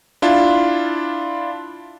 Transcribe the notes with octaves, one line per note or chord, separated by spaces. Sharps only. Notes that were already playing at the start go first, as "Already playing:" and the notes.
D4 E4 F4